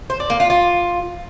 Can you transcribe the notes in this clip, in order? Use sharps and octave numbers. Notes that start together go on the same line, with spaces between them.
C5
D5
A#3
F4
F4